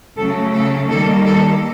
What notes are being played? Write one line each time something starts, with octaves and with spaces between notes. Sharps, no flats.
C#3 F#3 A3 A4
A4
D#3 G3 A#3 A4
A4